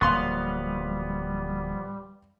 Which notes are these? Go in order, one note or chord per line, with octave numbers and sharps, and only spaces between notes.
D1 F3 G3 A#3 B3 F5 C6 C#6